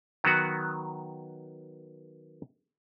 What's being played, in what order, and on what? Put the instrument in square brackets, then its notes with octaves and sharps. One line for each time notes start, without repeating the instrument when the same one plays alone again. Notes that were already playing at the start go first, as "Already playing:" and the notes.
[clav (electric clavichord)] D#3 F#3 B3 F#4